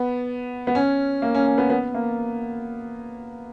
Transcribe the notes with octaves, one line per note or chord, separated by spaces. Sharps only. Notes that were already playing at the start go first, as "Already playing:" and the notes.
Already playing: B3
B3
C#4
A#3
C#4
C#4
B3
B3
A#3